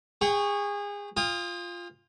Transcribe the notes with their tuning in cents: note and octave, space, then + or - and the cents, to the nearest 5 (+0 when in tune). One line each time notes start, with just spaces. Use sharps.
G#4 -30 G5 +0 C#6 +0
F4 +0 G5 +45 D#6 +0